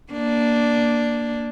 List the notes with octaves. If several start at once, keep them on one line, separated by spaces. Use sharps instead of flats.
A#3 D4